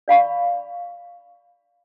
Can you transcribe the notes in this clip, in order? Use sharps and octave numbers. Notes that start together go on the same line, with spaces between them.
D5 F5 B5 C#6